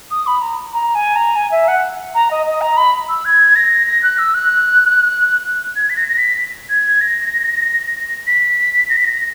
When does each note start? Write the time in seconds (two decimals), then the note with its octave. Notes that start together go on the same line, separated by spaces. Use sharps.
0.11 D#6
0.27 B5
0.41 A#5
0.73 A#5
0.95 G#5
1.16 A#5
1.36 G#5
1.51 E5
1.68 F#5
2.15 A#5
2.31 D#5
2.46 D#5
2.61 A#5
2.77 B5
3.09 E6
3.25 G#6
3.56 A#6
3.87 A#6
4.03 F#6
4.18 E6
4.34 F#6
5.76 G#6
5.90 B6
5.96 A#6
6.08 A#6
6.18 B6
6.69 G#6
7.01 A#6
8.27 B6
8.89 A#6
8.97 B6
9.05 A#6